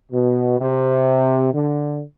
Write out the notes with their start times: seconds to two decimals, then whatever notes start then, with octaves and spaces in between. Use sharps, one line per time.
0.12 B2
0.59 C3
1.52 D3